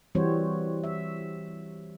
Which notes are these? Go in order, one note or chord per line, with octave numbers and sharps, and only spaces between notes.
E3 G3 C4 F#4 C5 C#5
E5